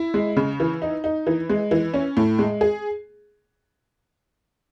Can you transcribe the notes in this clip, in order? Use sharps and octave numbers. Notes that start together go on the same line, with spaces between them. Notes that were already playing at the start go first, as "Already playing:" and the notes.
Already playing: E4
G#3
C#3
E3
D#4
D#4
E3
G#3
E3
C#4
A2
G#3
G#4